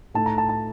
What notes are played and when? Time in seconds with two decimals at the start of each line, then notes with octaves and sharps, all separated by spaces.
0.14 A2 A3 D#4 A5
0.26 A#5
0.38 A5
0.49 A5